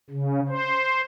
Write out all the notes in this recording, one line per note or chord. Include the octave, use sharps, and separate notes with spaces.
C#3
C5